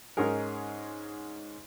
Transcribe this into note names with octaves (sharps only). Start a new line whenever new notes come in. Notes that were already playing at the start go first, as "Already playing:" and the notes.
G#2 C#4 D#4 G#4 A#4